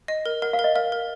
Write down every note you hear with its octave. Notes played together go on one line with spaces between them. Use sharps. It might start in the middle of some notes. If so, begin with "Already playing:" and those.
D#5
A#4
A#4 F#5
F5
A#4
D#5
A#4 F5
A#4